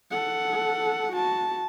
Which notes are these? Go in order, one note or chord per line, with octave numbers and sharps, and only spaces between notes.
A4 F#5
F#4 A5